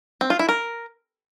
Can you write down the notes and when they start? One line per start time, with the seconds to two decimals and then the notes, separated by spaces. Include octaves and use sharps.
0.21 C4
0.30 F4
0.39 E4
0.49 A#4